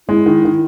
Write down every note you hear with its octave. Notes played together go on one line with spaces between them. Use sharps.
G#3 E4
D#3
D#3